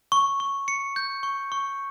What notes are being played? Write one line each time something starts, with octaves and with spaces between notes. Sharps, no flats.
C#6
C#6
C#7
G6
C#6
C#6